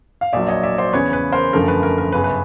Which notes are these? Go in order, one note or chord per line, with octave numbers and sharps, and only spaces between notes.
F5
A#1 A#2 F#3 D5 E5
C#5 D#5
D5 E5
C5 D5
E2 C#3 E3 B4 C#5
B4
A#4 C5
F#1 F#2 D3 F3 A3 A#4
B4
A#4
A#4
G1 F#2 C#3 B4
B4